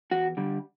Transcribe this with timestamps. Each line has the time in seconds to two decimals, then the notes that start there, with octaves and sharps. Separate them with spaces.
0.11 E2 F#4
0.37 D3 G3